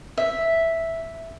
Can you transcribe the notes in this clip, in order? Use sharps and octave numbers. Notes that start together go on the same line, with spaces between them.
E5